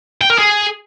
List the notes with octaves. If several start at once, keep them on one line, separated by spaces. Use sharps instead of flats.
G5
A#4
G#4